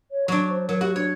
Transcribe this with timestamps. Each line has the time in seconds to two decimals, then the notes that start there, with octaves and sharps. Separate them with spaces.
0.11 C#5
0.28 F#3 D4 C#6
0.50 C5
0.69 F#3 A#4
0.81 F#4 G4
0.96 D4 C#5